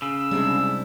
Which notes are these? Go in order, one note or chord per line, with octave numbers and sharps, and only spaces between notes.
C#3 E6
C3 G3 G#3 D4 E4